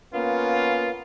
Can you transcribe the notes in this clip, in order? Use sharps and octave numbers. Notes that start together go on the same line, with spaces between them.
A#3 B3 C#4 F4